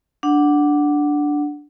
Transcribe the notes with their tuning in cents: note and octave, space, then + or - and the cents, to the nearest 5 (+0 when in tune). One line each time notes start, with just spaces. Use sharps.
D4 +0 F#5 +0